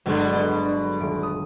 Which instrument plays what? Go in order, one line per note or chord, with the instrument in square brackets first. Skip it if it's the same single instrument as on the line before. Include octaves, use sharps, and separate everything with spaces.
[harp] G1 F#3 G#3 [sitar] B2 D3
[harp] B3
D#1 D7
D#6